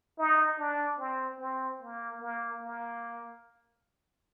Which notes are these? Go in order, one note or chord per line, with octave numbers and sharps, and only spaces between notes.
D#4
D4
C4
C4
A#3
A#3
A#3